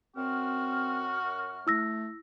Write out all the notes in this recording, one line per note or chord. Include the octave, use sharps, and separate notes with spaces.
F#2 C4 F#4 F6
A3 E4 E6 A#6